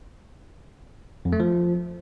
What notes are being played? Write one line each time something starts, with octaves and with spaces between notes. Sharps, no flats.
F2
A3
F3